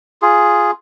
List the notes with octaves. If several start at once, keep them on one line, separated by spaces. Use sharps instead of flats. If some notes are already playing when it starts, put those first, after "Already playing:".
F4 G#4